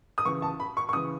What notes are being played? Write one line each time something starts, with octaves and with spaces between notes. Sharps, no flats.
D#6
C#3 E3 C#6
A5
B5
C#6
C#6
C#3 E3 D#6